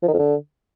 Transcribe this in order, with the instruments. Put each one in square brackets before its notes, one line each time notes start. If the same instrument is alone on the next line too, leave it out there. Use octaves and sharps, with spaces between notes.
[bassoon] F3
D#3
F2
D3